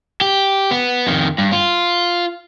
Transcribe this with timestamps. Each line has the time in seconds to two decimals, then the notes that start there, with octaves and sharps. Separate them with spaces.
0.21 G4
0.71 B3
1.07 F2 D#3
1.38 G2
1.53 F4